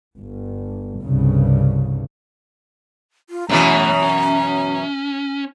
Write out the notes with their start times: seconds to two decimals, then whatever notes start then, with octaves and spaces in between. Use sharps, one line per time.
0.18 G1
1.03 C2 G2 C#3
3.30 F4
3.49 F#2 B2 E3 A3 A#5 B5
4.03 C#4